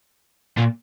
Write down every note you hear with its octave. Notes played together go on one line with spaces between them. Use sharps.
A#2